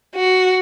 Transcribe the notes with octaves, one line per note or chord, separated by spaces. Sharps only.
F#4